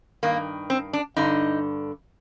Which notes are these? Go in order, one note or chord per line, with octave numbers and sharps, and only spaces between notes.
G2 D#3 A#3
C4
D4
G2 D3 D#4